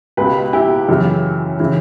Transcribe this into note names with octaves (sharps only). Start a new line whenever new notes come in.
C#2 B2 G4 B4
E4 G4
F#2 C#3 E3
C#3 E3